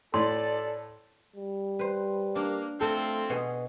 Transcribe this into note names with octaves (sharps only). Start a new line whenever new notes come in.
A2 A4 D5 C6
G3
B4 C5
A#3 D4
F3 A3 C4 A4
B2 G#4